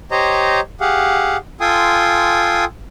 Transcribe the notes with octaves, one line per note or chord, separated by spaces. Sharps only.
G4 C5 C#5 D#5 A#5
G4 G#4 F5 F#5
F4 A4 G5 G#5 C6 D#6